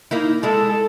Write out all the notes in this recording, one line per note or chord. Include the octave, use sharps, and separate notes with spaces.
A#3 D#4 E4
G#3 E4 A4